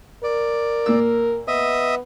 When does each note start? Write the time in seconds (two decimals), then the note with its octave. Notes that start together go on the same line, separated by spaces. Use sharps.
0.24 A#4 D5
0.86 A#2 A#3 E6
1.48 B3 D#5 E5 D#6